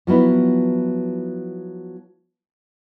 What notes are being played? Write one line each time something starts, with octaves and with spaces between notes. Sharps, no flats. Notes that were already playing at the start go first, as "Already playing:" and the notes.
F3 F#3 B3 E4